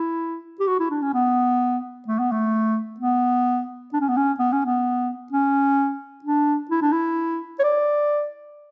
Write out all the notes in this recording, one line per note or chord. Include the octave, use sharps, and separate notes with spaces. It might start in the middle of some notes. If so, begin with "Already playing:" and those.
Already playing: E4
G4
F#4
E4
D4
C#4
B3
A3
B3
A3
B3
D4
C#4
B3
C#4
B3
C#4
B3
C#4
D4
E4
D4
E4
C#5
D5